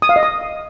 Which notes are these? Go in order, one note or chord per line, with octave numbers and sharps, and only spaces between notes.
D#6
F5
D#5
D#6